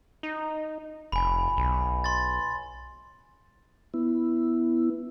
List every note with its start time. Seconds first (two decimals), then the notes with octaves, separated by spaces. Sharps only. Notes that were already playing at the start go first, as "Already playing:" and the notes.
0.23 D#4
1.12 F1 G#5 B5
1.57 B1
2.04 C6 A6
3.94 B3 E4